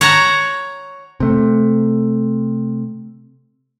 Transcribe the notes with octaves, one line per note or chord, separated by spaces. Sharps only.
C#5 F#5 A5 A#5
C3 A3